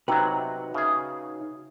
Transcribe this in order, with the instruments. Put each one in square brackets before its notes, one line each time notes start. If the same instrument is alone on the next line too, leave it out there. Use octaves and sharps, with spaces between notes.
[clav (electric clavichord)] C3 F#3 [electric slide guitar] D#4 F#4 B4 [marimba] G5 A#5
[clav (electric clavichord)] C#3 G#4 [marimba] E5